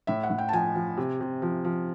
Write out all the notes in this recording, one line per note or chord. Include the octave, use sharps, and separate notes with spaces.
A2 E5
F#5
A2
G5
A5
F3 G#5
F3
C3
C3
F3
F3